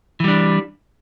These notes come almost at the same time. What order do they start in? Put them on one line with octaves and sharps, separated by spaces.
E3 G3 D4